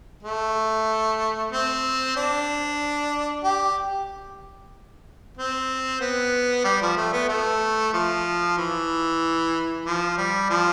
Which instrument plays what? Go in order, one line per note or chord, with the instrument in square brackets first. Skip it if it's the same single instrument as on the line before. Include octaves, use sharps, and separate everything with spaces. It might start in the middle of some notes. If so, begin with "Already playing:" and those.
[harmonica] A3
C4
D4
G4
C4
B3
G3
F3
A3
B3
A3
F3
E3
F3
G3
F3